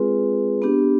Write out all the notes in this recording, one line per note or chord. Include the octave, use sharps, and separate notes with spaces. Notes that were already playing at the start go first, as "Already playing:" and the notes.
Already playing: G#3 C4 F4 G#4 B4
B3 D4 G4